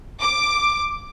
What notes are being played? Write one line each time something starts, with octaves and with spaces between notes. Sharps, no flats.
D6